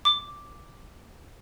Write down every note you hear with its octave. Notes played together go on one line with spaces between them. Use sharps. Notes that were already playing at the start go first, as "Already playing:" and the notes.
D6